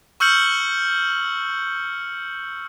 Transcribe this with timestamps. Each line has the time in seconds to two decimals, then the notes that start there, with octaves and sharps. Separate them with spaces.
0.20 C#6 E6 F6 G6 C#7 F#7